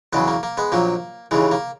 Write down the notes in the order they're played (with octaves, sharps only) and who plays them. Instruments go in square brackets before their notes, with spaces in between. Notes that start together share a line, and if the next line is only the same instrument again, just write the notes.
[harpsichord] E2 C#3 F#3 G#3 B3
A#3
A#3
G#3 B3
A#1 A#2 F#3 A#3
D#2 C#3 E3 G#3
A#3